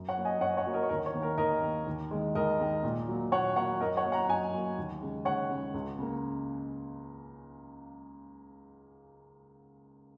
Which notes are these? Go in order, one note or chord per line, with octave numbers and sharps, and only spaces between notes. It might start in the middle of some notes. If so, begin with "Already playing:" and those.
Already playing: F#2
C#5 F#5
F#3 A#3
D#5 G#5
F#2 C#5 F#5
C#5 F#5
F#3 A#3
A#4 D#5
C#5
D#2 A#4
C#5
D#3 A#3
A#4
D#2 A#4 D#5
D#3 A#3
D#2
D#3 G#3
D#2 A#4 D#5
D#3 G#3
A#2
F#3 A#3
A#2 C#5 F#5
F#3 A#3 C#5 F#5
F#2 A#4 D#5
C#5 F#5
F#3 A#3
F#5 A#5
F#2 D#5 G#5
F#3 A#3
D#2
C#3 G#3
D#2 C#5 F#5
C#3 G#3
C#2
C#3 A#3